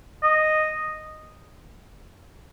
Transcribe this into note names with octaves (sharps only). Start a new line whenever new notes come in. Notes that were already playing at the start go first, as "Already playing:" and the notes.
D#5